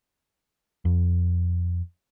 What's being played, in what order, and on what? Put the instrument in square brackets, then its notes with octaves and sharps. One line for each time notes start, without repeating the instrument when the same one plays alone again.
[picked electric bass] F2